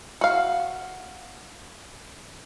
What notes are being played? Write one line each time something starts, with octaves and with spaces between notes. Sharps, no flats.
F#4 F5